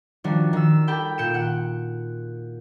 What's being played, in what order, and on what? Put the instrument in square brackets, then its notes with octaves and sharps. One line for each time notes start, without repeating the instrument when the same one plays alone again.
[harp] D#3 F3 G3 D4 F#4
D#3 E6
G4 A4 G5 B5
A#2 G6 C#7 D7 E7
F#5